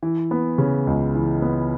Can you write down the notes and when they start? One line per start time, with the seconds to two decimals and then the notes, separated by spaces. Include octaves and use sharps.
0.03 E3
0.31 B3
0.58 C#3
0.87 C#2
1.15 E3
1.42 B3